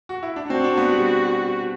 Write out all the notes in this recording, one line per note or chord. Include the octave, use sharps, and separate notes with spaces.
F#4
E4
D4
C4 F#4
D4
B3
G3